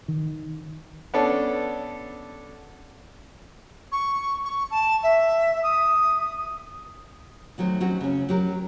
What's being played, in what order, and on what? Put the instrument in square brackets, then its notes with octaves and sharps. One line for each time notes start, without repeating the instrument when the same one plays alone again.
[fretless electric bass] D#3
[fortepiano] B3 C#4 D4 A4
[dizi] C#6
C#6
A5
E5
D#6
[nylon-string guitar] D#3 F#3 A3 C4
F#3 G#3 C4 C#4 F#4
C#3 C#4
F#3 G4 A#4